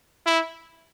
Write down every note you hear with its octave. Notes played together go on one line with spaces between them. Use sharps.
E4